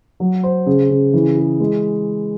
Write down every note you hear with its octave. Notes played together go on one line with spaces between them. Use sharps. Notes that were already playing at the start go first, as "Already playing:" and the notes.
F#3
C5
C#3
C#3
E3
G#4
G#3